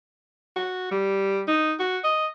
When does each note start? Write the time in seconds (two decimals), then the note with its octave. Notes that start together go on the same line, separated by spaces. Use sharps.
0.56 F#4
0.91 G3
1.47 D#4
1.80 F#4
2.04 D#5